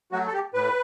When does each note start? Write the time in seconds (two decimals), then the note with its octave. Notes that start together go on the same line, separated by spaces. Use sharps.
0.12 F#3 A3 F#4
0.27 A4
0.33 G4
0.54 A2 B4